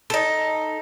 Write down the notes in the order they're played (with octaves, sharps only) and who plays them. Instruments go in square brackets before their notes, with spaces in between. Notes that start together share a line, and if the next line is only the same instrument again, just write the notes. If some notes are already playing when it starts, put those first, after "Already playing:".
[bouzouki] D#4 A4